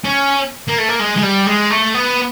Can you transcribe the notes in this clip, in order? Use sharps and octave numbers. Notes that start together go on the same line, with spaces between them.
C#4
A#3
A3
A#3
G#3
G#3
G3
G#3
A3
B3